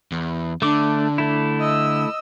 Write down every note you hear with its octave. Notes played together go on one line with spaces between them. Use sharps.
E2
D3 A3 D4 D6
A3 E4
D#5 E6